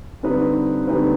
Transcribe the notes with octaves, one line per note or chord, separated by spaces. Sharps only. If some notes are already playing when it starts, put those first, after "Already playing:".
D3 G3 C4 D#4 B4
D3 G3 C4 D#4 B4